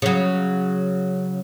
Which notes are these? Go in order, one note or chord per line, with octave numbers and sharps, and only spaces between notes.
C#3 F#3